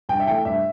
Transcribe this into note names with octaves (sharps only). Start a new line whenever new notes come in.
G2 G5
E5
E3 A3 G5
G2 E5